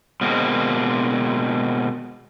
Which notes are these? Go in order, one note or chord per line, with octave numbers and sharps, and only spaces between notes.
B2 G#3 A#3 C4